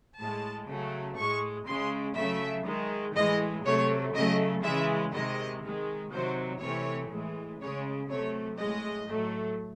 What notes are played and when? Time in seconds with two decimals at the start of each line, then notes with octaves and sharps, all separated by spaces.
0.19 A2 G#3 A5
0.69 C#3 F#3 A3
1.17 A2 G#3 C#6
1.67 C#3 G#3 C6
2.17 C#3 F#3 A3 E5
2.66 D#3 G#3
3.15 A2 E3 G#3 D#5
3.65 C3 F#3 A3 C#5
4.14 C#3 F#3 A3 D#5
4.63 C#3 E3 G#3 E5
5.13 C3 D#3 G#3 D#5
5.63 D#3 G#3
6.12 C3 D#3 F#3 C5
6.61 C3 E3 A3 C#5
7.10 A2 E3 G#3
7.60 C#3 G#3 C#5
8.09 C3 F#3 A3 C#5
8.59 A2 G#3 D#5
9.08 A2 F#3 A3